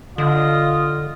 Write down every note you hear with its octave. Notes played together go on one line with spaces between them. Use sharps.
D3 F4 D#5